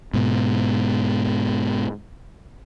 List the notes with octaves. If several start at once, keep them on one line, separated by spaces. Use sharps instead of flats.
G#2 B2